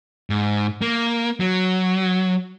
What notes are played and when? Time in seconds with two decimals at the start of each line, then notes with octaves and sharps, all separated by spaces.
0.30 G#2
0.82 A#3
1.40 F#3